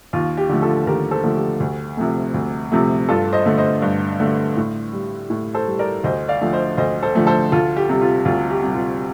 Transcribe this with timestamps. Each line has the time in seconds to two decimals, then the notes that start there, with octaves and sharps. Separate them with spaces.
0.13 D#2 F4
0.37 G4
0.49 D3 F3 A3
0.62 F4 A4
0.86 D#2 G4 A#4
1.11 A4 C5
1.23 D3 F3 A3
1.36 G4
1.60 D2
1.97 C3 F3 A3
2.34 D2
2.72 C3 F3 A3
3.09 G2 F4 A4
3.33 C5 D#5
3.46 D3 A3
3.58 C5 D#5
3.82 G2
4.20 D3 A3
4.57 A2
4.93 G3
5.30 A2
5.54 A4 C5
5.67 G3
5.79 A#4 D5
6.04 D2 C5 D#5
6.28 D5 F5
6.41 D3 F3 A3
6.53 C5 D#5
6.77 D2 C5 D#5
7.03 A4 C5
7.15 D3 F3 A3
7.27 A4 C5
7.52 D2 F4 A4
7.77 G4
7.89 C3 G3
8.02 F4
8.25 D2 F4
8.50 G4
8.63 C3 G3
8.75 F4